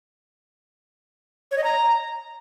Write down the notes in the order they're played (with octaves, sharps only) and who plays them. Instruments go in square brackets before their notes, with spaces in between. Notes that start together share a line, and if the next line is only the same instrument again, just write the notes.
[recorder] C#5
D#5
A#5